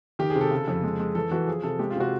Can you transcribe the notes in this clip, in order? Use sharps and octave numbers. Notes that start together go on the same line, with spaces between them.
D#3 G4
G#4
C3
A4
C#3
F2
G#3
G#3
E3 A4
E3 F#4
F3 G#4
C3 A4
G#3 G4
F4
C3 F#4